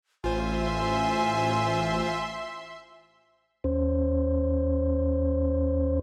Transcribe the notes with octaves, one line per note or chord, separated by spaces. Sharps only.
A1 F4 C5 E5 G#5 C6
D#2 C#4 C5